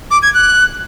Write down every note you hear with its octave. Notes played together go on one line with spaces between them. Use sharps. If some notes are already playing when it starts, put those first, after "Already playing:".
D6
G#6
F#6